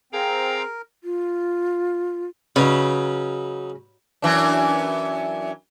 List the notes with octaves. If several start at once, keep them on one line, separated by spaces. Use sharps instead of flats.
C4 G#4 A#4 F5 G5 A#5
F4
C#3 F#3 D#4 B4
F#2 E3 D4